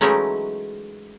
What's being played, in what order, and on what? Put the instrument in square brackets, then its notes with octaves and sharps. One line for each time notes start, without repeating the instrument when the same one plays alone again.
[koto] E3 F#3 G#3 A3 C#4 D#4